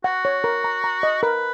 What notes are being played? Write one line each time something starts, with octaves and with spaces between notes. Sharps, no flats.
F#4 F#5
C#5
A#4
A#5
A#5
D#5
A#4 B4